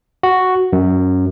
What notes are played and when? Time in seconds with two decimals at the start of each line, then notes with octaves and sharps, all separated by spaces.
0.23 F#4
0.73 F#2